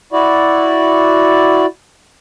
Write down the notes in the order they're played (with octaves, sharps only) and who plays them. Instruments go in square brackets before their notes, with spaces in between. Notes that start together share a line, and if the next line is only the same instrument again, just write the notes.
[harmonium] E4 F#4 D5